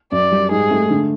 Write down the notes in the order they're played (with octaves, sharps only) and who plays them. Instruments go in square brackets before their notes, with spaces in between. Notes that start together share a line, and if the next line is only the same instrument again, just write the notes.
[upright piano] F#2 [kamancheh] D5
[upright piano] G3
[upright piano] G#2 [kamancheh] G#4
[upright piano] A3
D3